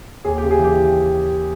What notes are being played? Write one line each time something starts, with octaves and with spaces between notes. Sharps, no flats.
D#2 G#4
G4
C#3
G#4
E3 G4